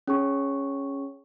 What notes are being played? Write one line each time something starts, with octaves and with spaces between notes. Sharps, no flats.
C#4 G#4 C#6